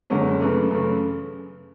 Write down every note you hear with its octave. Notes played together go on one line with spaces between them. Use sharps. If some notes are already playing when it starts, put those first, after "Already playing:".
F#1 F#2 D3 G#3 C#4
F#2 C#3 E3 A3
F#2 C#3 E3 A3